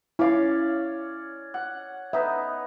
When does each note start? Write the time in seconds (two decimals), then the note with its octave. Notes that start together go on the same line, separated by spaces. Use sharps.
0.19 C#4 E4 C#5 D5 F5
1.54 F#5
2.13 B3 D#4 E5